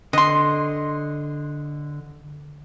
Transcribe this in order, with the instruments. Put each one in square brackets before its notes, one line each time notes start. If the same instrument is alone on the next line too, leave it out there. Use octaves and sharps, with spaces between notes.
[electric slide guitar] D3 [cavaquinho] D#5 C6